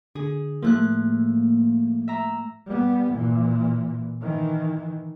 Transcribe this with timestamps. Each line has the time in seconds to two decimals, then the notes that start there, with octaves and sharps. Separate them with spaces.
0.15 D3 G#4
0.62 A2 F3 A3 A#3 F#6
2.08 E5 A#5
2.67 G3 B3
3.11 A#2 E3
4.21 D#3 E3